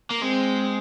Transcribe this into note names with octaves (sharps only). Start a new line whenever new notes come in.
A#3
G#3 C4